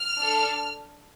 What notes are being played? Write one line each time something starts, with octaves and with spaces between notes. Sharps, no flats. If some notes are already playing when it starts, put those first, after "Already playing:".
Already playing: F6
D4 A4